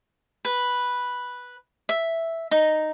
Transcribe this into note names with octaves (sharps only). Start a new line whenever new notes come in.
B4
E5
D#4